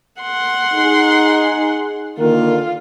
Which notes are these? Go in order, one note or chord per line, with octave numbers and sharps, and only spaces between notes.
F#5 C6
D#4 G#4
D3 D#3 A#3 F4